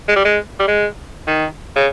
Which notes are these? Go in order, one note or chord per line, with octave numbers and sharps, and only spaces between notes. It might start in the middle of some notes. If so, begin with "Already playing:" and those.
G#3
G3
G#3
G3
G#3
D#3
C#3